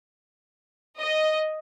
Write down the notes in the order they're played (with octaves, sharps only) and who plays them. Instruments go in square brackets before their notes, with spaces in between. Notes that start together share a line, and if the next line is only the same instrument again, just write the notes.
[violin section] D#5